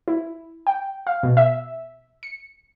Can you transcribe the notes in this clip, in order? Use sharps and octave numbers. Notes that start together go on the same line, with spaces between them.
E4
G5
F5
B2
E5
C#7